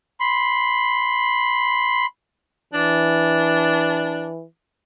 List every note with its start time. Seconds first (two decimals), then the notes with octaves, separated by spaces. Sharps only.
0.20 B5 C6
2.73 E3 D4